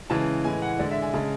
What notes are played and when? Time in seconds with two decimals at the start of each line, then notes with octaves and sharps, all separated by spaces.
0.10 C#3 E3 G#3 A5
0.45 A2 E3 G#3 G#5
0.62 F#5
0.79 D3 G#3 D5
0.91 E5
1.02 G#5
1.14 C#3 G#3 A5